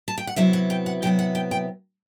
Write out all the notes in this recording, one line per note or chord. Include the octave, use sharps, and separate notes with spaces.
A5
G5
F#5
C3 F#3 B3 E4 E5
F#5
G5
F#5
C3 F#3 B3 E4 G5
F#5
G5
G5